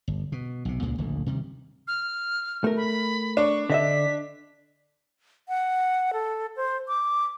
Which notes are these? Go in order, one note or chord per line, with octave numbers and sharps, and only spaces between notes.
G1
B2
B1 C3
C#2 A#2 C#3 G#3
D1 A#1 D3
C3 D#3 G3
F6
A3 A#4
B5
D4 C#6
D3 D#5 E5 B6
F#5
A4
C5
D6